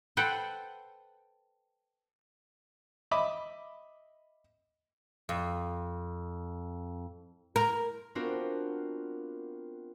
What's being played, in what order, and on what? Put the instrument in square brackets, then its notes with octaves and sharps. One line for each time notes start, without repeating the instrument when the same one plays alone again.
[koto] A4 B4 C5 F#5 G5
[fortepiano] D#5 E5 B5 D6
[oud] F2
A#4
[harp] B3 C4 D4 F4 F#4 A#4